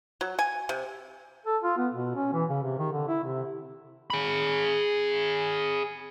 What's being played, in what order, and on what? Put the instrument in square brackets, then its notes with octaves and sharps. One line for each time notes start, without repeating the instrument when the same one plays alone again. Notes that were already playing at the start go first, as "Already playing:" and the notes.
[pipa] F#3
G#5
C3
[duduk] A4
F4
B3
B2
C#4
E3
C#3
C3
D#3
D3
E4
C3
[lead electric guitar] G#4 B5